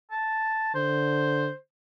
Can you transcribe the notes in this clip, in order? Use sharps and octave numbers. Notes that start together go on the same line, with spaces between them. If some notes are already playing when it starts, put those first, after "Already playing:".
A5
D3 C5